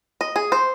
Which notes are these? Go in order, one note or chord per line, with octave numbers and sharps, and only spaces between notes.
D#5
G#4
C5